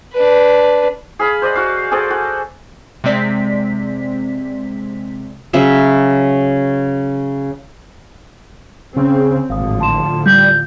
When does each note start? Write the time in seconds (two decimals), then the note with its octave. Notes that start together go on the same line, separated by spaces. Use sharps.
0.13 D4 B4
1.19 G#4 F5 B5
1.42 C5 D5 D#5 F#5
1.55 F#4 F5
1.91 G#4 A4 C5 D5
2.10 F#4
3.04 C3 G#3 C4 D5 B6
5.53 C#3 F#3 E5
8.97 C#3 C4
9.50 G#1 A2 D3 F3 F5 D#6
9.80 A5 C6 E7
10.26 G3 G6